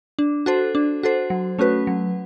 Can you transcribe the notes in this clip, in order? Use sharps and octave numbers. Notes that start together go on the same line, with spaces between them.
D4
F#4 A4 C5
D4
F#4 A4 C5
F#3
A3 C#4 F#4 B4
F#3